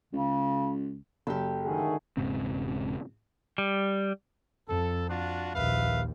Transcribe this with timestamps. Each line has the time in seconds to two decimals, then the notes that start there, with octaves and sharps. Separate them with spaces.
0.13 C#2 C#3
1.27 F#1 G4 A4
1.65 G#2 D3 D#3 A3 F#4 G#4
2.17 E1 G#2 C#3 C4
3.58 G3
4.68 F2 A4
5.10 D4 F4 F#4
5.54 A#1 D#2 B4 E5 F5